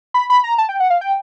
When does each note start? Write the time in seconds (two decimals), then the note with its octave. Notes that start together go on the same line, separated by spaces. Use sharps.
0.14 B5
0.30 B5
0.44 A#5
0.58 A5
0.69 G5
0.80 F#5
0.90 F5
1.01 G5